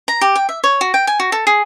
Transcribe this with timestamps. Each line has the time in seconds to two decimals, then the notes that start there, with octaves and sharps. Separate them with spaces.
0.08 A#5
0.21 G4
0.36 G5
0.49 E5
0.64 C#5
0.81 F#4
0.94 G5
1.07 G#5
1.20 F#4
1.32 A4
1.47 G#4